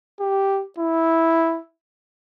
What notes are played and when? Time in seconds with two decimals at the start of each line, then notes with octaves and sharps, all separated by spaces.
0.20 G4
0.78 E4